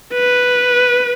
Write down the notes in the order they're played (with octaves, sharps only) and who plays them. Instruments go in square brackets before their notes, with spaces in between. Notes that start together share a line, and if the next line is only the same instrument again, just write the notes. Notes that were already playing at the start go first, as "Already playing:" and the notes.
[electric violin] B4